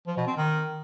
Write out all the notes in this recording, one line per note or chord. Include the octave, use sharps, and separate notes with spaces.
F3
B2
C4
D#3